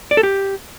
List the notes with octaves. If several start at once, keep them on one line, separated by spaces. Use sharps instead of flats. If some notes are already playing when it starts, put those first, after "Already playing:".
D5
A4
G4